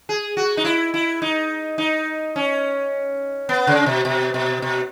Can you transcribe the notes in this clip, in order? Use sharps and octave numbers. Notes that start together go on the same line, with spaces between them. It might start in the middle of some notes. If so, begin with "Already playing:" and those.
G#4
F#4
D#4
E4
E4
D#4
D#4
C#4
B3
C#3
B2
B2
B2
B2